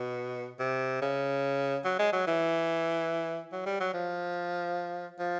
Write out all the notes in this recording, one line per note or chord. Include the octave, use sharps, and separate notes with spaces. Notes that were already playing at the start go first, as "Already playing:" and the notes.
Already playing: B2
C3
C#3
F#3
G#3
F#3
E3
F#3
G3
F#3
F3
F3